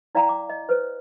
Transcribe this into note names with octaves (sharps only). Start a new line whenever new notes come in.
E4 D5 F5 G5 A#5
D6
D#5
B4 C5